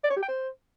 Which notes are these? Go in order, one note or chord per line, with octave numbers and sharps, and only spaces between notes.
D5
C#5
G4
G5
C5